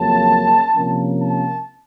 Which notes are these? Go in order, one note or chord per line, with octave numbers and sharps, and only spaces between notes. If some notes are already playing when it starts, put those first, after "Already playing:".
Already playing: F2 C#3 F#3 A#3 C#4 A5
C3 F3 A#3 C#4
A5